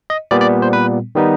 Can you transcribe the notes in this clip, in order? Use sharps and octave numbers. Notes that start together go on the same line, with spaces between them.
D#5
A#2 G3 B3 D5
D5
C5
B4
D#3 G3 B3 D#4